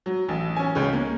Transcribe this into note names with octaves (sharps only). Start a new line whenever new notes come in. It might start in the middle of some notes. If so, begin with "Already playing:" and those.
F#3
A1
C#4 G#5
C#2 G#3 C#4
A#3